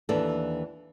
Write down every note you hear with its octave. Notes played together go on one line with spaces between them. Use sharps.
D#2 E3 D4 A4